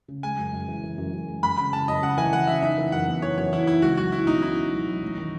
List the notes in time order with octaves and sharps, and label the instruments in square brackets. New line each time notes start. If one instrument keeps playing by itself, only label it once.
[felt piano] C#3
[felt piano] G#3 [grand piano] G#5
[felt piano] F#2
F#2
E3
E3
F#2
F#2
G#3
[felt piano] F#2 [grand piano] B5
[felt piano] C#3 [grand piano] B5
[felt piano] C#3 [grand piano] A5
[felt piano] F#2 [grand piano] D#5
[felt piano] C#3 [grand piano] F#5
[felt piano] E3 [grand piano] G#5
[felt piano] E3 [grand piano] F#5
[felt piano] C#3 [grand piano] E5
[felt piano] D#4 [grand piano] E5
[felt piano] E3
[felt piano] F#2 [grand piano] F#5
[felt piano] B3
[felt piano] E3 [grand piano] C#5
[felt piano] F#2 [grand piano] C#5
[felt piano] E3 [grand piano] E4
[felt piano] D#4 [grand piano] E4
[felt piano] C#2 [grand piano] F#4
[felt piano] F#3 [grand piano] F#4
[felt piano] C#4 [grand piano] E4
[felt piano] B2 [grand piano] D#4
[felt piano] C#4 [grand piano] E4
[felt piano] C#4
F#3
F#3
A1
D#3